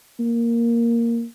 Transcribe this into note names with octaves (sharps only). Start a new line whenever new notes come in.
A#3